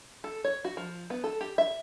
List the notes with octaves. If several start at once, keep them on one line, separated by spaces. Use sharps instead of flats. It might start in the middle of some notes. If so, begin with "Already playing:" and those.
A4
C#5
F#4
F3
B3
A4
G4
E5